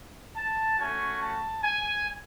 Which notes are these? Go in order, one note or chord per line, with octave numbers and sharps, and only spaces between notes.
A5
A3 C#4 F#4 G#5
A5
G#5